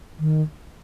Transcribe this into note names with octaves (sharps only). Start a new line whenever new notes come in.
D#3